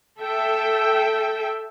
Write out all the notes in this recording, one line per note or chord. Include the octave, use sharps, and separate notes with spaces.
A4 E5 G5